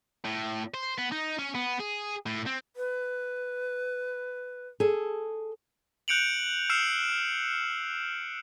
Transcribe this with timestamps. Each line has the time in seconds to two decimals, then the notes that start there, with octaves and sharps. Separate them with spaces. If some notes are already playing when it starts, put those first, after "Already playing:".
0.24 A2
0.74 C5
0.98 B3
1.12 D#4
1.39 C#4
1.55 B3
1.80 G#4
2.26 A2
2.46 C4
2.76 B4
4.80 G#4 A4
6.08 F#6 G6 C#7 D7 F7 F#7
6.70 E6 F6 C7 C#7 E7 F7